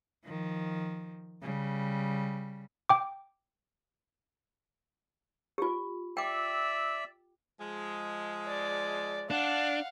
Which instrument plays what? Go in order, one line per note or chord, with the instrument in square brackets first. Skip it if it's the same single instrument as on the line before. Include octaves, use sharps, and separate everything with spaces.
[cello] D#3 F3
C#3 G3
[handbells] G5 D6
[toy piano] F4 G4
[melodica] D5 E5 E6 [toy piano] G5 D6
[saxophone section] F3 G#3
[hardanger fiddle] D5
[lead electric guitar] D4 [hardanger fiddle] F5 F#5